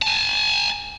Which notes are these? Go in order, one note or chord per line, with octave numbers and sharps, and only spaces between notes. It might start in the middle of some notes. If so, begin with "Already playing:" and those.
G#5 A5